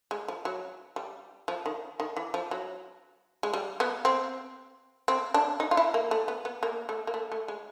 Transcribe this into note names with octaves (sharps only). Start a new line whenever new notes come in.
G#3
F3
F#3
G3
F3
D#3
D#3
E3
F3
F#3
G#3
G3
B3
C4
C4
D4
D#4
F4
E4
A#3
A3
B3
B3
A#3
A3
A#3
A3
A3
G#3